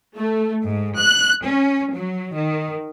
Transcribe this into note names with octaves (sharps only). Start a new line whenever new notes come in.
A3
G#2
F#6
C#4
F#3
D#3